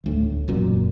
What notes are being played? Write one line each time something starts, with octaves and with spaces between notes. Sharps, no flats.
E1 D2 A2
E1 F#2 A#2